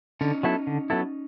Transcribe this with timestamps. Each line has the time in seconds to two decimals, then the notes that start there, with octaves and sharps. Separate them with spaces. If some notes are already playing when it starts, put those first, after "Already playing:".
0.21 D3 C#4 D#4
0.43 F#3 B3 E4 A4
0.67 D3
0.90 F#3 B3 E4 A4